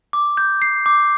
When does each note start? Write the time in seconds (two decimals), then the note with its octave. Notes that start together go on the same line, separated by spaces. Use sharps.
0.13 D6
0.37 G6
0.62 C7
0.86 D6